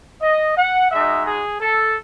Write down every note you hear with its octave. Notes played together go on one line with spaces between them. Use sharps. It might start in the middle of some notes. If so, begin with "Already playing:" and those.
D#5
F#5
G#3 D#4 F#4 E5
G#4
A4